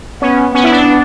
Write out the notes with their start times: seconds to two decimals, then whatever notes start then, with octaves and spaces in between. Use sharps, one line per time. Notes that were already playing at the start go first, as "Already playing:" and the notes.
0.22 B3 C#4
0.55 B3 C#4
0.64 E4
0.72 D4